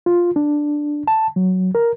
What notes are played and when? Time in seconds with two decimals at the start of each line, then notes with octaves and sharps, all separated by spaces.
0.06 F4
0.36 D4
1.08 A5
1.36 F#3
1.75 A#4